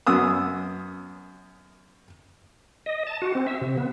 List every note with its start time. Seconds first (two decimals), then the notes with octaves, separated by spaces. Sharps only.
0.07 F#2 B3 D#6 E6
2.86 D#5
3.07 A5
3.22 F#4
3.35 C4
3.47 E5
3.61 C3
3.77 B3